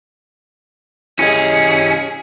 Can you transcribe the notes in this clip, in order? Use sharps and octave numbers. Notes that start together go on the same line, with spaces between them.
C#4 E4 G4 G#4 D#5